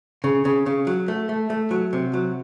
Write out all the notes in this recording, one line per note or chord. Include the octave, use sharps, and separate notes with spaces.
C#3
C#3
C#3
F#3
A3
A3
A3
F#3
C3
F#3